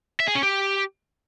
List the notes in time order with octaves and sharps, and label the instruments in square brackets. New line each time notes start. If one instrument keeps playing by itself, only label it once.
[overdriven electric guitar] E5
G#4
C#4
G4